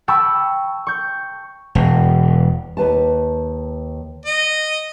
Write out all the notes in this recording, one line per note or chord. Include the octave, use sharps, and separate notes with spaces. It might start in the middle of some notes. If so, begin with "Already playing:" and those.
G5 A5 B5 C#6 E6
C#6 G6
E1
D#2 B4 A5
D#5